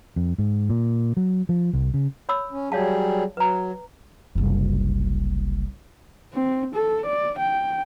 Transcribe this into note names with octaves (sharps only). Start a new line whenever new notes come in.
F2
G#2
A#2
F#3
F3
C2
C#3
C#5 B5 E6
C#4
F#3 G3 G#4 C#5 F5 A5
F#3 B4 A#5
F#1 C2
C4
A4
D5
G5